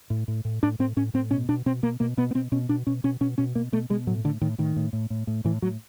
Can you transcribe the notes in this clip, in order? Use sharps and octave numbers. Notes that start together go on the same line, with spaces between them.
A2
A2
A2
A2 D4
A2 C4
A2 C#4
A2 C4
B2 C#4
B2 D4
B2 C4
B2 A#3
B2 A#3
B2 B3
B3
B2 C4
B2 C#4
B2 D4
B2 C#4
B2 C#4
B2 C#4
B2 C#4
B2 A#3
B2 A3
B2 G#3
A2 F#3
A2 D3
A2 D#3
A2 D#3
A2
A2
A2
A2
A2 E3
A2 F#3